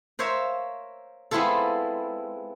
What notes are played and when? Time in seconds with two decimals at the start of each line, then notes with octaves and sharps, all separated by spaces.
0.19 A#4 C5 C#5 E5 F5
1.31 G#3 B3 C4 E4 F4 A4